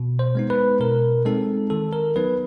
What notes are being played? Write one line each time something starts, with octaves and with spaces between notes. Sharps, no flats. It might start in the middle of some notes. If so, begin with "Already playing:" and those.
Already playing: B2
C5
G#3 B3 D#4
B4
B2 A#4
G#3 C4 D#4 A4
D#3 A4
A#4
F#3 B3 D#4 B4